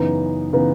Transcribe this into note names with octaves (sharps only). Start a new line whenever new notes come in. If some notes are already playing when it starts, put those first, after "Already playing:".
Already playing: F#2 C#3 E3 B3 D#4
C#3 E3 B3 D#4